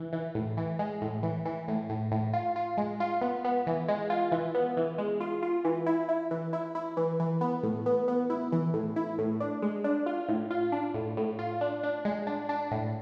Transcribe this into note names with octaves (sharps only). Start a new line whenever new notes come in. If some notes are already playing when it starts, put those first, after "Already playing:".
Already playing: E3
E3
A2
E3
G#3
A2
E3
E3
A2
A2
A2
F4
F4
G#3
F4
B3
B3
E3
G#3
F4
E3
B3
E3
G#3
F4
F4
E3
E4
E4
E3
E4
E4
E3
E3
B3
A2
B3
B3
E4
E3
A2
E4
A2
D4
G#3
D4
F4
A2
F4
D4
A2
A2
F4
D4
D4
G#3
D4
D4
A2